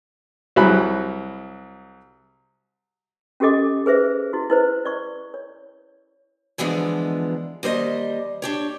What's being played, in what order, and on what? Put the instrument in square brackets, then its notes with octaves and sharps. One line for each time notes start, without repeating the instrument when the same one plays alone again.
[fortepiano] C2 F#3 G#4 B5 F#6
[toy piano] C#4 F#4 G4 A4 D#5 D6
G#4 B4 C5 E5
E4 F#4
E4 B4 C5
D5 C#6
C#5
[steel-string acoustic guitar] D3 E3 F3 G#3 B3 D4
D#2 G3 C5 D#5
D4 G4 C#5